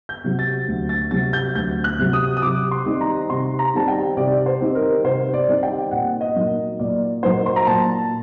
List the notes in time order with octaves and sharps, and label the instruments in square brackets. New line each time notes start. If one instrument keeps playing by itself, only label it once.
[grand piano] G6
C3 F#3
A6
D2
A6
C3 F#3 A6
G6
D2 G6
F#6
C3 F#3
D#6
D#6
C3 D6
C6
D#3 G3 C4 D#4
A#5
C3 C6
A#5
D#3 G3 C4 D#4 A5
G5
C3 D5
C5
D#3 G3 C4 D#4
A#4
C3 C5
D5
D#3 G3 C4 D#4
G5
A#2 F#5
D#5
F#3 A#3 D#4
A#2 D5
F#3 A#3 D#4 C5
C6
A#5
A#2 A5